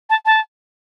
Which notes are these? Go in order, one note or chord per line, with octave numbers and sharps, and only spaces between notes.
A5
A5